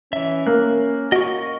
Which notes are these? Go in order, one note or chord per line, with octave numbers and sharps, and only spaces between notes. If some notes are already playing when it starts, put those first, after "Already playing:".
E3 C#4 E5
A#3 F#6
F#4 D#5 C#6